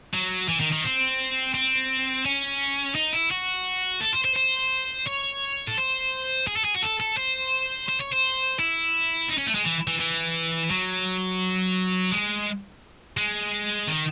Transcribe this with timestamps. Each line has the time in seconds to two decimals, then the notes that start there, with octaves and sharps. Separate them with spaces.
0.14 F#3
0.49 E3
0.60 D#3
0.72 D#3
0.84 C4
1.54 C4
2.25 C#4
2.95 D#4
3.13 E4
3.31 F#4
4.00 A4
4.13 C5
4.24 C5
4.36 C5
5.07 C#5
5.67 A4
5.78 C5
6.47 G#4
6.56 A4
6.65 G#4
6.74 F#4
6.82 A4
7.00 A4
7.17 C5
7.88 C5
8.00 C#5
8.12 C5
8.59 E4
9.29 D#4
9.38 C#4
9.47 A3
9.55 G#3
9.64 E3
9.87 E3
9.99 E3
10.71 F#3
12.12 G#3
13.17 G#3
13.87 D#3